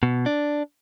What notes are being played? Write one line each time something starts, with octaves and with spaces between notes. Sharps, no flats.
B2
D4